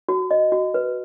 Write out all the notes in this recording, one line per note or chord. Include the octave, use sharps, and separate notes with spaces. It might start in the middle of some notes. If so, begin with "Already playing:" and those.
F#4
D#5
F#4
B4